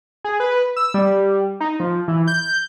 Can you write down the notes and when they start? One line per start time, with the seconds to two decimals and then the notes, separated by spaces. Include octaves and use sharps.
0.25 G#4
0.40 B4
0.76 E6
0.94 G3
1.60 D#4
1.80 F3
2.08 E3
2.28 G6